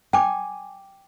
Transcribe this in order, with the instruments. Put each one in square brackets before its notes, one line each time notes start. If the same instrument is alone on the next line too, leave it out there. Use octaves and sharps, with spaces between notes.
[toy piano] G5 D6 [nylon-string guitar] G#5